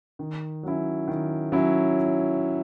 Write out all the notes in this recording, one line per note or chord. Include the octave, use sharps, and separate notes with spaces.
D#3
F#3 C#4 E4
D#3
F#3 C#4 E4